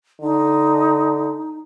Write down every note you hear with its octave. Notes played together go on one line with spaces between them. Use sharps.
D3 D#4